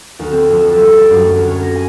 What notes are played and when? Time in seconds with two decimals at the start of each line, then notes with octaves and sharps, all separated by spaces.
0.19 D2
0.31 C4
0.49 F2
0.63 A4
0.76 G3
0.92 D5
1.10 F#2
1.23 A3
1.36 D2
1.50 C#5
1.63 A#6
1.76 G#5